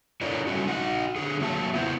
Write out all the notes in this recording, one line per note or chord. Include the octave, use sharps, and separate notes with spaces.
D4 E4 A4 A#4 C#5 D5
G3 A3 C#4 F#4
D#4 F#4 F#5
D3 G#4
F#3 A#3 E5 A5
B3 E4 C5